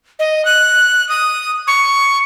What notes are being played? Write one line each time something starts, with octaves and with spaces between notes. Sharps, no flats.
D#5
F#6
D#6
C#6